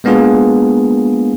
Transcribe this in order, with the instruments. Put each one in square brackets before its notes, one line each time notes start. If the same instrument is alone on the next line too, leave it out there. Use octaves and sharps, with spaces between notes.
[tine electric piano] G#3 A#3 B3 D4 F4 G#4